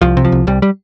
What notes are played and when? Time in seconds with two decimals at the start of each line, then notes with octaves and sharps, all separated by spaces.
0.02 C2 F3
0.17 C3
0.25 F3
0.32 C2
0.47 C2 G3
0.62 G3